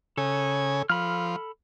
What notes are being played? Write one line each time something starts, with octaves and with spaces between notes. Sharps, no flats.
C#3 A4 G#5
F3 A4 B5 F6